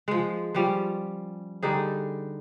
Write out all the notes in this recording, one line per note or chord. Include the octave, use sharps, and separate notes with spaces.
F3 G#3
F3 G3 C#4
D3 G3 D#4 G#4